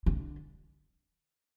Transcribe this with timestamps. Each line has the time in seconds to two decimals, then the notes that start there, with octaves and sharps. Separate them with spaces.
0.06 D3